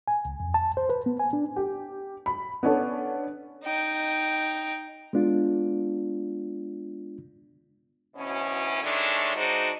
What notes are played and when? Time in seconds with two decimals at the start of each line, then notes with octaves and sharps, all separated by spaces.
0.08 G#5
0.25 C#2
0.40 F2
0.54 A5
0.77 C5
0.89 B4
1.06 B3
1.20 G#5
1.33 D4
1.56 G4
2.26 B5
2.63 B3 C#4 D4 A4
3.64 D#4 G5
5.13 G#3 B3 D4 F4
8.16 D2 B2 E3 C#4
8.82 D#3 G#3 A3 C#4 D4
9.36 G#3 D4 D#4 F#4 C5